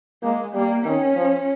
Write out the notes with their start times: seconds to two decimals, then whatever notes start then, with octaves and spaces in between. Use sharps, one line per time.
0.23 G#3 A#3
0.54 G3 A#3
0.85 D#3 C#4
1.16 F3